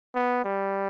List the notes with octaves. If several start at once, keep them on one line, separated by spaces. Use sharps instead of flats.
B3
G3